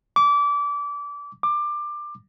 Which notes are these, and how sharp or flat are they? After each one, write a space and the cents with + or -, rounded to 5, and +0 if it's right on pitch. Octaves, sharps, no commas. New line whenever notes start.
D6 -25
D6 +20